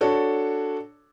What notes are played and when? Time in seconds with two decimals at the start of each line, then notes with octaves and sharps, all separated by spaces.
0.01 D4 F#4 A4 C#5